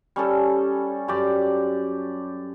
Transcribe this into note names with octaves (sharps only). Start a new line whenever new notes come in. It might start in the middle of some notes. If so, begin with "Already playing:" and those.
G3 C#4 A4
F#2 G4 D5